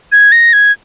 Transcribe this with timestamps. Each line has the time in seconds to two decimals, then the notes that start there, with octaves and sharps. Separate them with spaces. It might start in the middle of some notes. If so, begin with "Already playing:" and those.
0.12 G#6
0.32 A#6
0.53 G#6